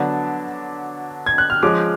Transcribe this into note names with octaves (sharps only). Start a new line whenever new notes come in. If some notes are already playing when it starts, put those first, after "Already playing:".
Already playing: D3 F#3 B3 D4 A5
G#6
F#6
F6
F3 G#3 C#4 D6